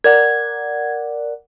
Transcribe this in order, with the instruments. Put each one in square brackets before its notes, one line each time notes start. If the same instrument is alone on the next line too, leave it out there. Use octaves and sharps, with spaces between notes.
[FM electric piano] A#4 D5 F#5 [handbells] G#6